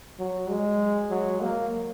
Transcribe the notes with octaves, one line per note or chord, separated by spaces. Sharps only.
F#3
G#3
F#3
A#3